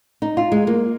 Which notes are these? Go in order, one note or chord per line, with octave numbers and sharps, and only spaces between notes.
D#4
F4
G#3
A#3